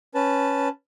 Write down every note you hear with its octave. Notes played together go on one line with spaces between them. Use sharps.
C#4 B4 A5